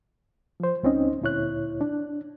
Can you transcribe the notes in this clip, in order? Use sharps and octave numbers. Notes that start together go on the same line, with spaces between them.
F3 C5
C#2 C#3 C4 C#4 D#4 D#5
D2 A#2 E4 C#5 F#6
D4